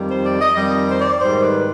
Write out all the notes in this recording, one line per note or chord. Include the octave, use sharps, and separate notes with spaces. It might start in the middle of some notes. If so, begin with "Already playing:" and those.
Already playing: F2 D#3 G3
C5
D5
D#5
F2 D#3 G3
C5
D5
G#2 D#3 G3 C5
B4